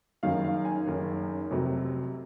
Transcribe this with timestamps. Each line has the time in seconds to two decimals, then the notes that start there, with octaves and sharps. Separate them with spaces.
0.23 F#1 F#2 D#3 F5
0.44 F5
0.65 G#5
0.87 F#1 F#2 D#3
1.51 F1 F2 C3 F#3